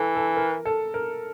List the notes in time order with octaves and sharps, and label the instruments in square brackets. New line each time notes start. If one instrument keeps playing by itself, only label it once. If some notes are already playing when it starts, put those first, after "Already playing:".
Already playing: [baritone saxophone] E3 [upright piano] A4
[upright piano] A4
A#4
A4
A#4